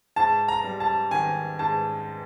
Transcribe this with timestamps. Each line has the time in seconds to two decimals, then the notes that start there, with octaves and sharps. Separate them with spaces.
0.16 G#2 A5
0.48 A#5
0.64 G3
0.80 A5
1.11 D#3 G#5
1.59 G#2 A5